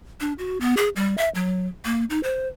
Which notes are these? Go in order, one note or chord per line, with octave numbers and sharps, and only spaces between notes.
D4
F#4
B3
G#4
G3
E5
F#3
A#3
D#4
C5